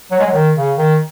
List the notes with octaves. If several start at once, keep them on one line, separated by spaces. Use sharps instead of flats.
F#3
G#3
F#3
D#3
C#3
D#3